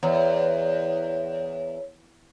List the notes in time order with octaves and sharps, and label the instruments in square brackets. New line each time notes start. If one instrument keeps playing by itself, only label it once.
[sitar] E2 [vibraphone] C#5